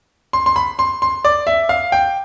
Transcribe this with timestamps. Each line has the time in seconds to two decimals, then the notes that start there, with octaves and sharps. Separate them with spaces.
0.33 C6
0.46 C6
0.56 B5
0.79 C6
1.02 C6
1.25 D5
1.47 E5
1.69 F5
1.92 G5